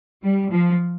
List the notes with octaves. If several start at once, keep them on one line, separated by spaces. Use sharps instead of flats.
G3
F3